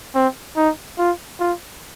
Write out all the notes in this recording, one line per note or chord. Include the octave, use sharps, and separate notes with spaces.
C4
D#4
F4
F4